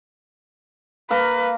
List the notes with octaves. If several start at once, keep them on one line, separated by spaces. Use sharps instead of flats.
A#3 B4 F5 A#5